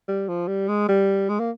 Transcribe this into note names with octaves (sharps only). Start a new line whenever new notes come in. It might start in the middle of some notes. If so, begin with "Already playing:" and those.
G3
F3
G3
G#3
G3
G#3
A#3